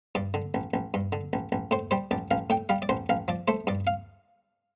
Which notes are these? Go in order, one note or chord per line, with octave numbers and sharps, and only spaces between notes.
G2 D5
D3
A1
A1
G2
D3
A1
A1
A2 C5
G3 C5
A1 D5
A1 F5
A2 G5
G3 F5
D5
A1 C5
A1 F5
F3 D5
A3 C5
G2 D5
F5